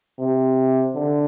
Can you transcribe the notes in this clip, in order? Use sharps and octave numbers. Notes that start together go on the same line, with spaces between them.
C3
D3